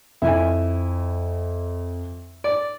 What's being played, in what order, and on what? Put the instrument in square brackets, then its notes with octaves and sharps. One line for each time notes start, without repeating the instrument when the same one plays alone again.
[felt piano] F2 [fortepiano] E4 G#5
[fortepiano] D5